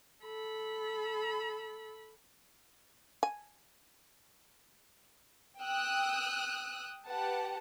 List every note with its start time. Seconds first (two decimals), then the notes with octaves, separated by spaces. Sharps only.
0.24 A4 B5
3.23 G#5
5.60 G5 D#6 E6 F#6
7.06 G4 B4 F#5 A5